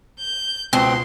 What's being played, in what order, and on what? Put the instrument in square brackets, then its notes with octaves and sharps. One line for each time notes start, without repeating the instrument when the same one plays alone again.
[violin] G6
[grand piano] C#2 B2 [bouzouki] C4 [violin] C6